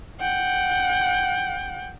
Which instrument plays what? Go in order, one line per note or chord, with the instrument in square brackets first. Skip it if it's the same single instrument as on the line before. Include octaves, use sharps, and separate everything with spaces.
[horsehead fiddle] F#5 G5